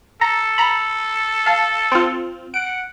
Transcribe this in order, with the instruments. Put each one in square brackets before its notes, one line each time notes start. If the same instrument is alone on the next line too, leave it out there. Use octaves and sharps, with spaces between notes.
[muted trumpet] A4 [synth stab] A#5
[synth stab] A#5 B5
F5 A5
C4 F4
[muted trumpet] F#5 [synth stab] D7